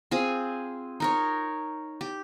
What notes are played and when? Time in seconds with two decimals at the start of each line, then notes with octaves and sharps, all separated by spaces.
0.11 C4 F4 G#4
1.00 D#4 A#4 C#5
2.01 G4